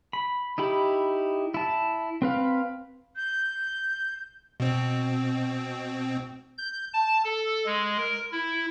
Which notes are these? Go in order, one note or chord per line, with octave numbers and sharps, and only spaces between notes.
B5
D#4 E4 G4 B5
E4 A5
C4 B4 F5
G6
B2 C4
G6
A5
A4
G#3
A#4
E4